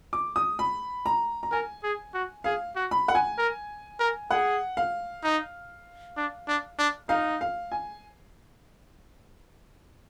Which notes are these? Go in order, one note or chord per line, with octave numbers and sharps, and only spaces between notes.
D6
D#6
B5
A#5
A#5
A#4 G#5
G#4
F#4
G#4 F5
F#4
B5
F#5
G#5
A#4
A#4
G#4 F#5
F5
D#4
D4
D4
D4
D#4 F5
F5
G#5